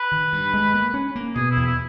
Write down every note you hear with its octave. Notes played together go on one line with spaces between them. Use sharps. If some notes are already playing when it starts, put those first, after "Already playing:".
Already playing: B4
D#3
G2
G#3
A#3
C#4
A#3
B2 G#4
E4
E2
E4